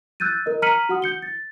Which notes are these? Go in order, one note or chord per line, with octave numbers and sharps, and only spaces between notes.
E6 F#6 G6 A6 D#7
A#4 D#5
A#5 F6 B6 C#7 D#7 F#7
F#4 F#5 D#6
G6 C#7 G7
A6